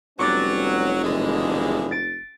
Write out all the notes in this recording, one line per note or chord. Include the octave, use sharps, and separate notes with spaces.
F1 F#3 G3 B3 C#4 C#6 D6 A6
F#1 A2 D3 E3 G#3
A6 D7